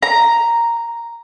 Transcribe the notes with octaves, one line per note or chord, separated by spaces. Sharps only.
A#5